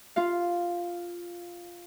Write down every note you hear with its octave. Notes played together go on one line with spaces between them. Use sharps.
F4 F5